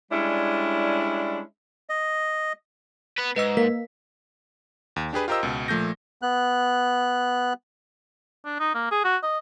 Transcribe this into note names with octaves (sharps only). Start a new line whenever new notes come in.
G3 G#3 C#4 D4 E4
D#5
B3 B4
G#2 B4 D#5 E6
A#3 B6
D#2
D4 G4 G#4 B4
F4 G4 A#4 C5 D#5 E6
C#2 B2
A#2 F3 A3 G6 A#6
B3 F#6
D4
D#4
A#3
G#4
F#4
D#5